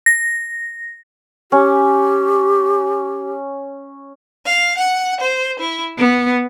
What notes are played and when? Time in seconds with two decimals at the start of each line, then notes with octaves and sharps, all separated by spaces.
0.06 A#6
1.52 C#4 G4
4.45 F5
4.78 F#5
5.21 C5
5.59 E4
5.97 B3